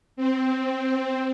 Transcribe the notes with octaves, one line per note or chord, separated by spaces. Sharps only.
C4